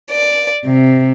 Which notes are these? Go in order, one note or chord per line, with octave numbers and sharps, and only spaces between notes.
D5
C3